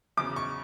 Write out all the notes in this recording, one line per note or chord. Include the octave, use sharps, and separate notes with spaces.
E2 C#3 F#3 D6
C#6